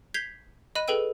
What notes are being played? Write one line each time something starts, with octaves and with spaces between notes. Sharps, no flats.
G6 G#6 B6 C7 F7 G7
D#5 B5 F#6 D#7
G#4 A4 B4 G5 E6 D#7